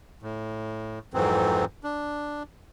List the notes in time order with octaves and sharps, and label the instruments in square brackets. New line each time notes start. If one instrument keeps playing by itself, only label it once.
[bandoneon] A2
F2 G#2 E3 F#3 C4
D4